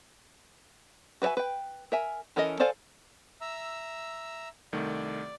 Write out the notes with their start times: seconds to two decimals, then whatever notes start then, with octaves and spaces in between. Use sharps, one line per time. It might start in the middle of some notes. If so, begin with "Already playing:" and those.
1.22 F#4 B4 C#5 E5 G#5
1.37 B4 G5
1.92 A#4 E5 G#5
2.36 E3 C#4 A4 A#4 D#5
2.60 A4 C5 D5 F5 G#5
3.41 E5 A#5 E6
4.73 C2 D#3 A3 D5